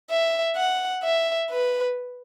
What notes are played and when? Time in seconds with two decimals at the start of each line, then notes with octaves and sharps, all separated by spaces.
0.10 E5
0.57 F#5
1.03 E5
1.51 B4